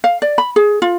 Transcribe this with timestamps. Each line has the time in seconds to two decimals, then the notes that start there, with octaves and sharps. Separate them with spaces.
0.04 F5
0.22 D5
0.38 B5
0.56 G#4
0.82 F4